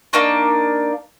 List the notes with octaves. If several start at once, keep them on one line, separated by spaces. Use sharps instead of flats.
A#3 D4 D#4 C#6